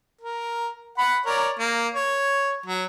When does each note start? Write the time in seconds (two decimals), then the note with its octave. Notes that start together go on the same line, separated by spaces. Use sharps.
0.21 A#4
0.98 F#5 B5
1.26 A#4 C#5 D5
1.59 A#3
1.94 C#5
2.66 F#3